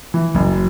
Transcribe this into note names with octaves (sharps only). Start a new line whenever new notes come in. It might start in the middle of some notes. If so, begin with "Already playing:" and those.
E3
F#1 F#3